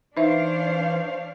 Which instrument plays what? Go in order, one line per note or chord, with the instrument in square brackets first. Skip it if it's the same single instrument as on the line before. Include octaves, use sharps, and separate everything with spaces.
[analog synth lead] E3 [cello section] D4 C#5 F5 [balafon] D#4 E5 [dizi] C5